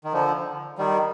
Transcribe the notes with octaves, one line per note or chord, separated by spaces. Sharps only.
D#3
D3 F3
D#3 G3